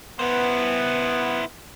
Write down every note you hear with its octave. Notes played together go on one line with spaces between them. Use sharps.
B3 E4 C5